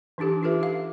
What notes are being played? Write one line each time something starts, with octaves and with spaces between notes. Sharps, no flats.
E3 D4 D#4 G4 A4
F4 G4 A4 B4 E5
G4 F5